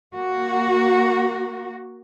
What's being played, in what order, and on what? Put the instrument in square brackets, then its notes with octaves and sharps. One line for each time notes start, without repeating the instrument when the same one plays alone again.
[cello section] A#3 F#4